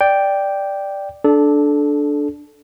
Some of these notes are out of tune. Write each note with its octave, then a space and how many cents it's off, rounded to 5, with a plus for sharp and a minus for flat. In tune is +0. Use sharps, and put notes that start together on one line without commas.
D5 +0 G5 +0
D4 +0 A4 -20